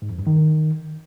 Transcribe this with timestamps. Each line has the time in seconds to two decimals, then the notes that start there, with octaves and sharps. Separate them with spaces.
0.02 G#2
0.10 F2
0.18 G2
0.27 D#3